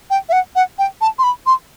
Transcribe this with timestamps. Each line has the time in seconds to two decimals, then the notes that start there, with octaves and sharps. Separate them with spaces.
0.10 G5
0.29 E5
0.32 F#5
0.55 F#5
0.79 G5
1.01 A5
1.19 C6
1.23 B5
1.46 C6